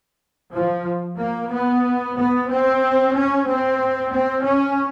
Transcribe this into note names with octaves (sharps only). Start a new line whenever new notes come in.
F3
A#3
B3
B3
C4
C#4
C4
C4
C#4